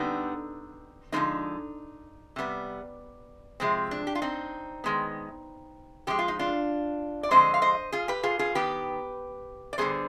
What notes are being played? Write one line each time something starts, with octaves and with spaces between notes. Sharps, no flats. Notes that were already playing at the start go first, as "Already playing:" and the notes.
Already playing: D3 G3 B3 C4 D#4
D3 F3 G#3 C4 D#4
C3 G3 B3
C3 F3 G#3 C4
D4
G4
F4
C4 D#4
D#3 G#3 B3
D3 F3 G#3 G4
F4
D#4
D4 F4
D5
D3 F3 G#3 C4 C5 D#5
F5
C5 D#5
F4 G#4
G4 B4
F4 G#4
F4 G#4
D#3 B3 G4 B4
D5
D3 G3 B3 G#4 C5